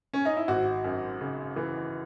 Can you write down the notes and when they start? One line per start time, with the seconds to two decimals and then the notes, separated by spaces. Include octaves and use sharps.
0.13 C#4
0.25 D#4
0.37 E4
0.48 G#1 F#4
0.84 F#2
1.21 C#3
1.56 E3